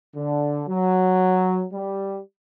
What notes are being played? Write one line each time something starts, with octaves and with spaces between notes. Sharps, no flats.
D3
F#3
G3